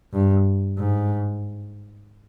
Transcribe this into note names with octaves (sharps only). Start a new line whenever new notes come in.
G2
G#2